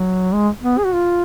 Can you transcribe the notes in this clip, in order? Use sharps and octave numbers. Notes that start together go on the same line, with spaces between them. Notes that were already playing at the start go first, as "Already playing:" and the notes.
Already playing: F#3
G#3
B3
G#4
F#4
F4